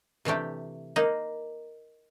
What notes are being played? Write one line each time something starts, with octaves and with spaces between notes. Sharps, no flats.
C3 E3 A3 D4 G4
A#3 D#4